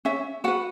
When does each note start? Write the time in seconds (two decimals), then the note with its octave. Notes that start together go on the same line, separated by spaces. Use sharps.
0.05 C#4 E5
0.44 F#4 B4 F#5